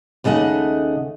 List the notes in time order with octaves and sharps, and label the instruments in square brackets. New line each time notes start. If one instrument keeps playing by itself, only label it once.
[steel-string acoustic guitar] D#2 C#3 A3 D#5 F#5